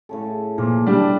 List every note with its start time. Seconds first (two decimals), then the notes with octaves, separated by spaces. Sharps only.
0.09 A2 C#3 A4
0.58 A#2 F3
0.87 G3 D4